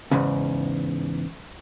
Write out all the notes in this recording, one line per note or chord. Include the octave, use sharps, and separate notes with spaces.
E2 G#2 C#3